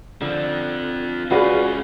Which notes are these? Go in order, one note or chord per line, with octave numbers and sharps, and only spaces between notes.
D3 F3 C4
G#3 C#4 F4 F#4 G#4 B4 D5